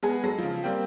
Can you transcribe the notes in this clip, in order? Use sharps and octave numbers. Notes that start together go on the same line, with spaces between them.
G#3 B3 G#4
F#3 G#3 A4
C#3 F3
G3 A#3 C4 G5